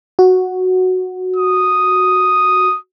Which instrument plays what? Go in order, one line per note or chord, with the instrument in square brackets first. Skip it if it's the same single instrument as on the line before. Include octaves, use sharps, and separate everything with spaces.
[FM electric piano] F#4
[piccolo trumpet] D#6